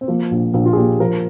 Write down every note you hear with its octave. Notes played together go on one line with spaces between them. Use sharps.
C4
F3 A#3
A#1
A#1 A#3
F4
G#4
A#2 G4
F3 A#4